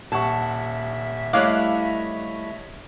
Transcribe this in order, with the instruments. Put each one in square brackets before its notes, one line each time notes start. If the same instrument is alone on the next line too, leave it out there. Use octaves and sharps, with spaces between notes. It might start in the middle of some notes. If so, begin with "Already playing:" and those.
[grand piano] D#1 F#5 C#6 [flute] E5 [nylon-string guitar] A5
[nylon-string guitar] G3 A3 E4 [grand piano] C#5 D#5 [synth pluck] F5 D6 F#6